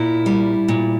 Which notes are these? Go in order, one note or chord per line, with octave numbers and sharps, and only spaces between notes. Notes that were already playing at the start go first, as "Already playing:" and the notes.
Already playing: A#2 E4
G3
A#2